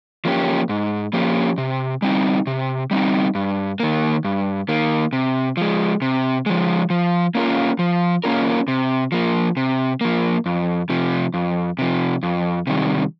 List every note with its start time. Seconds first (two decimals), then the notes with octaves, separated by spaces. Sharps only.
0.25 F3 A#3 C#4 G4
0.69 G#2
1.13 F3 A#3 C#4 G4
1.58 C3
2.02 G3 C4 D#4
2.47 C3
2.91 G3 C4 D#4
3.35 G2
3.80 D#3 A#3
4.24 G2
4.69 D#3 A#3
5.13 C3
5.57 F3 G#3
6.02 C3
6.46 F3 G#3
6.90 F3
7.35 A#3 C#4 F4 A#4
7.79 F3
8.24 A#3 C#4 F4 A#4
8.68 C3
9.12 F3 A#3
9.57 C3
10.01 F3 A#3
10.46 F2
10.90 C3 F3
11.34 F2
11.79 C3 F3
12.23 F2
12.67 C3 D#3 G3